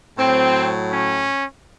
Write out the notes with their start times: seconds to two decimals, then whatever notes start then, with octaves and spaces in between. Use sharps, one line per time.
0.18 A2 F#3 C4
0.93 C#4